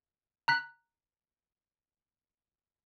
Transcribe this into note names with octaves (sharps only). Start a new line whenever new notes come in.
A#5 F#6 B6